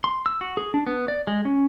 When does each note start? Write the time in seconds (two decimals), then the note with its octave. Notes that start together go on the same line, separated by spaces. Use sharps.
0.04 C6
0.26 E6
0.41 F#4
0.57 G#4
0.74 D4
0.87 B3
1.08 D5
1.27 G#3
1.45 C#4